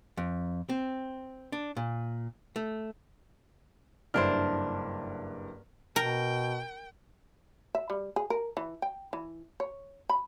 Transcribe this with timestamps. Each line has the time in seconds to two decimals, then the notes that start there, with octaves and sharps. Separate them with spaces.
0.17 F2
0.69 C4
1.52 D4
1.77 A#2
2.56 A3
4.14 F#1 G2 D4 E4 C5 F6
5.96 B2 A#4 G5
7.75 E5
7.90 G3
8.16 G#4
8.30 A#4
8.57 E3
8.82 G5
9.13 E3
9.60 C#5
10.09 B5